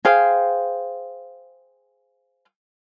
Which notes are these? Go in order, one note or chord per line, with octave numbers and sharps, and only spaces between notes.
G#4 C5 F5 G5